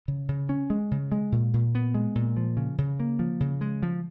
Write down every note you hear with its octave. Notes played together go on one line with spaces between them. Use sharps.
C#3
C#3
C#4
G#3
C#3
G#3
A#2
A#2
B3
G#3
A#2
F3
C#3
C#3
A#3
F3
C#3
G#3
F3